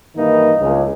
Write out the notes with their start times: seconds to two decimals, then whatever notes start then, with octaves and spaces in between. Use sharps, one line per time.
0.16 G2 D#3 E3 A#3 D#4
0.59 C#2